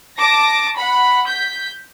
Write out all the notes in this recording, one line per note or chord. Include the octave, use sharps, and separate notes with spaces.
A5 D6 A#6
F#5 B5
G6 B6